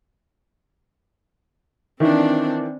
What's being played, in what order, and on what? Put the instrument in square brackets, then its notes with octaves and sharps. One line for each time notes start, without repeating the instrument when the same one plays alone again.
[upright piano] D#3 E3 [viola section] C4 D4